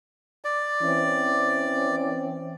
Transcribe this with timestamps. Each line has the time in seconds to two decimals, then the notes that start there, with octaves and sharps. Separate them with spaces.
0.45 D5
0.82 E3 C4 C#4